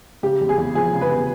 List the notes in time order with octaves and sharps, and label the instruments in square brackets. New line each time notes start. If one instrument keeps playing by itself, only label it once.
[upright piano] C#3 G4
E2
G#4
E2
F3 G#4
C#3
B4
E2